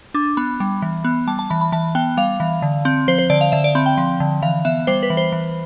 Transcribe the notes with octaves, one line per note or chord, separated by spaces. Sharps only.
D4 D6
B3 B5
G3
E3
B3
G3 A5
A5
E3 B5
B5
E3 A5
B3 G5
G3 F5
E3
D3
C4
F3 C5
C5
D3 D5
F5
D3 E5
D5
C4 B5
G5
F3
D3
E3 F5
B3 E5
G3 C5
B4
E3
C5
E3